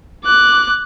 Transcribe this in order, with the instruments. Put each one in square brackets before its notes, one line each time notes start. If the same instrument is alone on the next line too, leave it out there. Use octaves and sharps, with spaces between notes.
[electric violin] D6 F#6